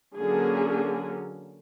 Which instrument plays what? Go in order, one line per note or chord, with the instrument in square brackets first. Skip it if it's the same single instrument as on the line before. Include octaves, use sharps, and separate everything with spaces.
[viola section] D3 F#3 A#3 C#4 G#4